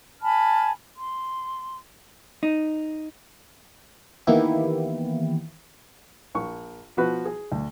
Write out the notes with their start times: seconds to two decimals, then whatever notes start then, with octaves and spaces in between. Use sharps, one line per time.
0.21 G#5 A5 B5 F6
0.97 C6
2.43 D#4
4.27 D#3 E3 A#3 B3 E4 G4
6.35 A#1 C#6
6.97 B2 F3 F#4 B4
7.26 G#4
7.52 D2